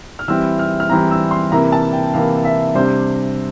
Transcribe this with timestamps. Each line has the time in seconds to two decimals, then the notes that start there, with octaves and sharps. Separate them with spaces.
0.19 F6
0.28 E3 G3 C4 E4 E6
0.59 F6
0.80 F6
0.90 E3 G3 C4 E4 A#5
1.11 E6
1.31 C6
1.52 C3 E3 A#3 E4 A#5
1.72 A5
1.93 G5
2.13 C3 E3 A#3 E4 F5
2.45 E5
2.75 C3 G3 D4 C5